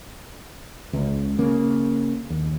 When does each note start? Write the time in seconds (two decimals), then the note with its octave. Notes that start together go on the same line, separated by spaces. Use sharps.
0.93 C#2
1.38 C#3 A#3
2.30 D#2